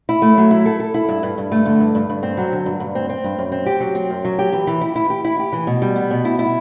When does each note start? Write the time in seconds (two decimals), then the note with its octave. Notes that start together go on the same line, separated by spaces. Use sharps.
0.09 E4
0.22 A3
0.37 F#3
0.51 E4
0.66 A4
0.80 A4
0.94 E4
1.09 G2
1.23 G2
1.38 G2
1.52 A3
1.65 D3
1.80 G2
1.95 G2
2.10 G2
2.23 C4
2.37 F#3
2.52 D3
2.66 G2
2.80 G2
2.95 C4
3.09 C4
3.24 G2
3.39 F#2
3.52 C4
3.66 G4
3.80 F#3
3.95 C4
4.10 F#2
4.25 F#3
4.39 G4
4.53 E3
4.67 E3
4.81 E4
4.96 E4
5.10 G4
5.25 E4
5.39 G4
5.52 E3
5.67 B2
5.82 G3
5.96 B3
6.11 B2
6.25 E4
6.39 E4